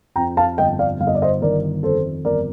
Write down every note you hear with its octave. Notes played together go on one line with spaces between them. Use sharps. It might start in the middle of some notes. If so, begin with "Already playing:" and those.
F2 G5 A#5
F5 A5
G1 D#5 G5
D5 F5
G1 F5
D#5
D5
C5 D#5
D#3 A#4 D5
F2 A4 C5
G1 A#4 D5